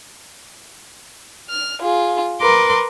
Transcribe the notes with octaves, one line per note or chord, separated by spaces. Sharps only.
F6
F4 G#4
A#4 B4 C6 D6